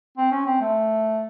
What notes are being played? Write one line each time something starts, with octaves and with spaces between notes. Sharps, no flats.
C4
C#4
C4
A3